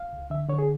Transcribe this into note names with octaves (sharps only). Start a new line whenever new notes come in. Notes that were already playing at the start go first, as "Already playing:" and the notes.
Already playing: F5
C#2
D3 E5
D3 C#5
G#4